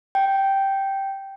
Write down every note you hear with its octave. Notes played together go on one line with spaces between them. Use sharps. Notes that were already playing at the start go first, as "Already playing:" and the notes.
G5